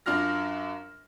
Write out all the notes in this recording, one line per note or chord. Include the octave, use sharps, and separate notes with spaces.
F#2 D4 F4 F6 A#6